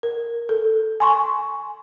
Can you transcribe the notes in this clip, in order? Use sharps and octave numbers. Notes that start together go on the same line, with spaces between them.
A#4
A4
G#5 C6 C#6